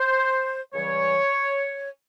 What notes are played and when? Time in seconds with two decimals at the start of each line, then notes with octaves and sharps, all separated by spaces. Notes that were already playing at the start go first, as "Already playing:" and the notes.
Already playing: C5
0.73 C#2 C#3 E3 G3 C#5